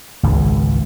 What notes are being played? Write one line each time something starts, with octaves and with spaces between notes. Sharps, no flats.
G#1 C#2